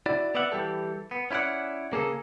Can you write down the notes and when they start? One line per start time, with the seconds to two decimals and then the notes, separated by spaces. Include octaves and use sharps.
0.06 E4 F#4 D5
0.35 B3 D5 E5 F#5
0.52 E3 G3 G4 A4
1.11 B3
1.31 C#4 E4 B4 D5 F#5
1.92 C#3 A#3 G#4 A4